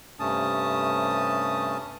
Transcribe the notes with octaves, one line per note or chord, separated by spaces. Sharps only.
G2 C3 A3 C#4 A5 D#6